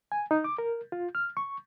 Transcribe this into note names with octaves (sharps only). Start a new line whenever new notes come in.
G#5
D#4
D6
A#4
F4
F6
C#6